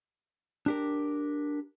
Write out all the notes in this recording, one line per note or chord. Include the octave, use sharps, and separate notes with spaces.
D4 G4 A#4